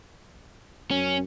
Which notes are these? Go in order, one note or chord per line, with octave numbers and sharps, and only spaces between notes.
F#2 C#4